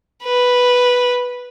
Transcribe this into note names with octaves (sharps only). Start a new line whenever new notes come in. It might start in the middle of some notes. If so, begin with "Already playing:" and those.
B4